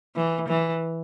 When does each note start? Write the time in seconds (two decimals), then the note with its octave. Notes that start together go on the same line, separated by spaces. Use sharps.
0.16 E3
0.48 E3